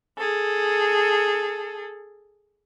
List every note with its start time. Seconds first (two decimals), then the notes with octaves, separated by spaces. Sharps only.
0.18 G#4 A4